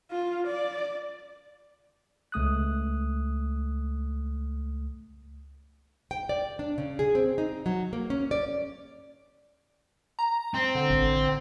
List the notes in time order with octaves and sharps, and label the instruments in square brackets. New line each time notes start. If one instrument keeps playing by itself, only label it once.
[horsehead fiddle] F4
D5
[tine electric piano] C#2 A3 D#6 F#6
[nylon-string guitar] G5
D5
D4
C#3
G#4
C4
D#4
F#3
A#3
C#4
D5
[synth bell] A#5
[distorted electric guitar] C4
[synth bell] D3
[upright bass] A1